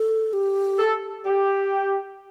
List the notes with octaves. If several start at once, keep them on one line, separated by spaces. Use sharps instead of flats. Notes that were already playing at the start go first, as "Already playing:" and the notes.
Already playing: A4
G4
A4
G4